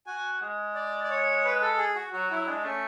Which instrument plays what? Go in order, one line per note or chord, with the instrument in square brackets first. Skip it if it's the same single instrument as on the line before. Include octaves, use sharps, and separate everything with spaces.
[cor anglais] F#4 [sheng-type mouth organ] G#5
[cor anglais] G#3
[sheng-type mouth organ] D5
D5
C#5
B4
A4
G#4
F#4
[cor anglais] F#3 [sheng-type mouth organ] F#4
[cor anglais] F#3 [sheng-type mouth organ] E4
[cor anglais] G#3 [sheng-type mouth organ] D4
[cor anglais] A3 [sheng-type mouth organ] C#4